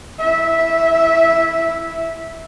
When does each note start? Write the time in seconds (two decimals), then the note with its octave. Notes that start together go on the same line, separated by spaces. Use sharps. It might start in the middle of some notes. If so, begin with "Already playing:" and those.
0.19 E4 E5